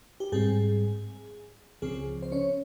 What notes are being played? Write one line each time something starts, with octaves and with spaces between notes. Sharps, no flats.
G4
G#2 G3 C4 G#4
C#2 C#3 F3 C4 G#4
C5
C#4 C#5